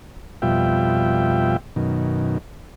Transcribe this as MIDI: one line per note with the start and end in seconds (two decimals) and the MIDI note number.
0.42 1.57 41
0.42 1.57 47
0.42 1.57 55
0.42 1.57 65
0.42 1.57 76
0.42 1.57 79
1.76 2.38 42
1.76 2.38 47
1.76 2.38 51